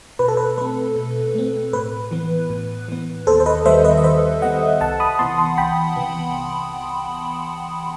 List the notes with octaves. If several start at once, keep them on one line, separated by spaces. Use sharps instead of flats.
B2 B4
A4
B4
A3 C4 B4
B2
A3 C4
A2 B4
E3 B3
A2
E3 B3
D#2 A4 C5
C5
B4 D#5
D#3 G3 B3 C5 E5
B4 D#5
D#5
D#2 C5 E5
D#3 G3 B3 D#5 F#5
C2 F#5 A5
B5 D#6
C3 E3 B3 A5 C6
A5 C6
C2 G5 B5
C3 E3 B3